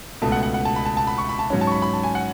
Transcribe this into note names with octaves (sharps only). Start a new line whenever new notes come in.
C#2 B2 A3 A5
F#5
F#5
F#5
A5
B5
A5
A5
B5
C#6
B5
A5
G#2 F#3 C#4
A5
C#6
B5
B5
A5
G#5
F#5